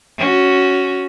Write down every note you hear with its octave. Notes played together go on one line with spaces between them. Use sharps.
C#4 F#4